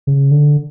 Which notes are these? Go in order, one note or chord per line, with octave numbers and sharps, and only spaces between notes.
C#3
D3